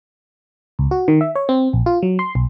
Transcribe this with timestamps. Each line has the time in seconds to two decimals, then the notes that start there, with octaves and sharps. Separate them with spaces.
0.79 C#2
0.91 F#4
1.08 D#3
1.21 E5
1.35 C#5
1.49 C4
1.73 A#1
1.86 F4
2.03 F#3
2.19 C6
2.35 B1